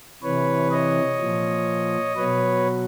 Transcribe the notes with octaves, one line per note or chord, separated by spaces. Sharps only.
C3 E3 B4 C#5
C#5 D#5
A#2 F3
B2 F#3 B4 C#5